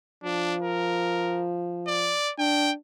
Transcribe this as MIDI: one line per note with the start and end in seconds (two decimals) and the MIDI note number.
0.24 2.14 53
0.24 0.55 62
0.62 1.46 70
1.87 2.31 74
2.39 2.73 62
2.39 2.71 79